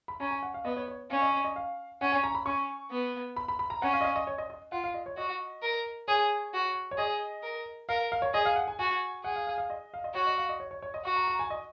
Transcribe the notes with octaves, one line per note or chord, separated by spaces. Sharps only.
B5
C#4 A#5
G#5
F#5
F5
B3 D#5
C#5
C#5
C#4 F5
D#5
D#5
D#5
F5
C#4 F#5
G#5
A#5
B5
C#4 C#6
B3
B5
B5
B5
A#5
C#4 F#5
F5
D#5
F5
D#5
C#5
D#5
D#5
F4 F#5
F5
D#5
C#5
F#4 D#5
A#4
G#4 C#5
F#4
C#5
G#4 D#5
A#4
A#4 F5
F5
C#5
G#4 D#5
F5
F#5
G#5
F#4 G#5
G#4 F#5
F5
F5
F5
D#5
F5
D#5
F#4 C#5
D#5
F5
D#5
C#5
C#5
C#5
D#5
F#4 C#6
A#5
A#5
G#5
D#5